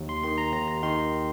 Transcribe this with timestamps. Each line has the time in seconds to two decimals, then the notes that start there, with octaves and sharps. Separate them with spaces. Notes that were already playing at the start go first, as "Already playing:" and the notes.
Already playing: D#2
0.09 C6
0.23 D#3 C6
0.38 A#5
0.53 D#2 A#5
0.68 A#5
0.82 D#3 C6